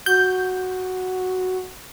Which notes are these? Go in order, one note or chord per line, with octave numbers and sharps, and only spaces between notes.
F#4 G6